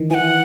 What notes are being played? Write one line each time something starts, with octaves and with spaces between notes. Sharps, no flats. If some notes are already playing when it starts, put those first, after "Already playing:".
Already playing: D#3 E3
E3 F#5 G#5